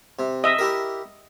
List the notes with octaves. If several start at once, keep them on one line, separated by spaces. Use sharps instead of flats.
C3
D#5 E5
E4 G4 A#4